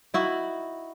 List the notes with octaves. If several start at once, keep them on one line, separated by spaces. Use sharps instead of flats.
D#4 E4 F#4